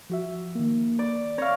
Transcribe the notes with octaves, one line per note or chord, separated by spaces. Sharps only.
F3 F#4 E5
D#3 A#3
D5
C4 C#5 F5 A#6